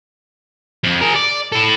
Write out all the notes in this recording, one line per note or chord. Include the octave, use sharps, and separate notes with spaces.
F2
G#4 A#4
D5
E4 A4